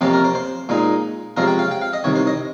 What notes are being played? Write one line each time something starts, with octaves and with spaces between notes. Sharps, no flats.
F2 C3 F3 A#3 C#4 G4
A#4
C5
C5
A#2 G#3 D#4
C3 F3 G#3 C#4 A#4
G5
F5
G5
F5
D#5
C2 C3 D#3 C#5
C5
D#5